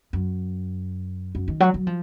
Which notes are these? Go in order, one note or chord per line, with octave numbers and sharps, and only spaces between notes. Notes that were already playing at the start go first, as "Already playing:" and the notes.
F#2
F#2
D#3
F#3
F#3
F3